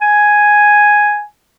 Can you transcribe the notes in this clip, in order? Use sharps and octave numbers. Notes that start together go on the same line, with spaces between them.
G#5